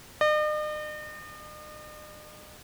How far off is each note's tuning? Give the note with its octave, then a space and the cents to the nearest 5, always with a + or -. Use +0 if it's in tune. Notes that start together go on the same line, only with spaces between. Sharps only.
D#5 -45